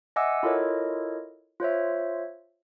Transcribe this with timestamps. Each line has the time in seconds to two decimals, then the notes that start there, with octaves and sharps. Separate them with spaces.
0.16 D#5 E5 F#5 G#5 D6 E6
0.43 E4 F4 A4 A#4 C#5 D#5
1.60 F4 C5 C#5 E5